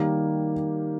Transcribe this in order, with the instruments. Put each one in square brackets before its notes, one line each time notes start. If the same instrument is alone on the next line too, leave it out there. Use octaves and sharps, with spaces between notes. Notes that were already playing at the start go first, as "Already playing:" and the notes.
Already playing: [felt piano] D#3 G3 A#3 G4